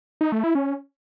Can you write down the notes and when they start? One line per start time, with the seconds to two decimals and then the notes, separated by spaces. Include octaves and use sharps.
0.21 D#4
0.32 A3
0.44 E4
0.55 C#4